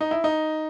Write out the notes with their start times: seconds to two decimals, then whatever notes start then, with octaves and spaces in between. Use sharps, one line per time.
0.01 D#4
0.11 E4
0.24 D#4